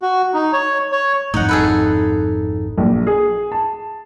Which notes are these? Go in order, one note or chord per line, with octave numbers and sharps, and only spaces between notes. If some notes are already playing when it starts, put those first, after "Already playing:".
F#4
D#4
C#5
C#5
G#1 F2 A2 D#4 F#5
G#4 A4 B4
A#1
G#4
A5